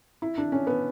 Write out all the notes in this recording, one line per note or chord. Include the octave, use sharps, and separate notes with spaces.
E4
D4
C#4
B3